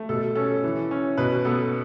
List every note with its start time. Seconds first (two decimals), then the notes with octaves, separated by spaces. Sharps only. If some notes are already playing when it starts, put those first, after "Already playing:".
Already playing: A3
0.09 B2 A4
0.35 C#4 A4
0.64 E3
0.91 C#4
1.17 B2 B4
1.45 B3 A4